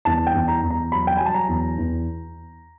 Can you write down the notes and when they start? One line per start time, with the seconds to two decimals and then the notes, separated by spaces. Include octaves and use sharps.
0.05 E2 A5
0.27 G5
0.34 E2
0.48 A#5
0.63 E2
0.70 A#5
0.92 F#3 B5
1.07 G5
1.17 F#3 G#5
1.26 A5
1.34 A#5
1.48 E2
1.78 E2